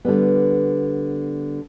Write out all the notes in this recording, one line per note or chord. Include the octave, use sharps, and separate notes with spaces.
D3 G3 B3